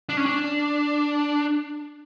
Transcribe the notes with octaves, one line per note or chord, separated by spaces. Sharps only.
D4
C#4
D4